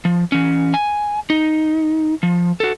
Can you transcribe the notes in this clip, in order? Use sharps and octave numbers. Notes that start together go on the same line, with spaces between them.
F3
E3 C#4
G#5
D#4
F3
F#4 A4